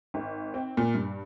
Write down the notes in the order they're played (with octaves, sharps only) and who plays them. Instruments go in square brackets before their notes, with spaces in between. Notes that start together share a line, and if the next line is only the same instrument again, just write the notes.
[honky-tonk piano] G#1
C4
A#2
G2